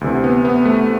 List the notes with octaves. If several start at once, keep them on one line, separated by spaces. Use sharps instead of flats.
D2 C3 E3
B3
B3
A3